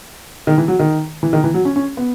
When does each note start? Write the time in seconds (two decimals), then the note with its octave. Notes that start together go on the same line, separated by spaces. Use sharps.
0.47 D#3
0.58 E3
0.68 F#3
0.79 D#3
1.23 E3
1.33 D#3
1.44 E3
1.54 F#3
1.65 C#4
1.76 C#4
1.97 B3